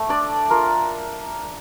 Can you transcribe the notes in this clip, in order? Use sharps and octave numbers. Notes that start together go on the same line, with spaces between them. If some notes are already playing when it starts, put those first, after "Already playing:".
Already playing: A3
D4 D5
F4 A#4